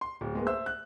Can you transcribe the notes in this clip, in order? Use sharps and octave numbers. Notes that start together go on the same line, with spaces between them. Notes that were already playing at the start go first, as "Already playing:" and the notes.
C6
D1
G#3 A#3 B3
C5 E5 E6
F#6